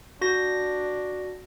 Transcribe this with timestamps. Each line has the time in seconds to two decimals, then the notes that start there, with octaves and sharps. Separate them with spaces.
0.21 D4 F#4 A#6